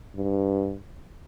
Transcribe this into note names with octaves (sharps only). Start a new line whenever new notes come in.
G2